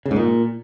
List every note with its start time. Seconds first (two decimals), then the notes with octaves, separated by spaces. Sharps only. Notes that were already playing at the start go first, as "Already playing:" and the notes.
0.06 C#3
0.11 G#2
0.16 A#2